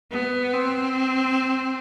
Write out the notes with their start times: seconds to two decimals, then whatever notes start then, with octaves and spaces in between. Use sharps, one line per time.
0.11 B3
0.53 C4